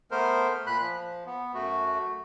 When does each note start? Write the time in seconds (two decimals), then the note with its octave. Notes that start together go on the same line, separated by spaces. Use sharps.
0.11 A3 B3 A#4 C5
0.67 A#2 B5 F#6
0.81 F3
1.26 B3
1.54 F#2 A3 F#4